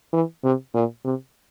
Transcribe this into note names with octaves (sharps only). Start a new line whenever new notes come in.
E3
C3
A#2
C3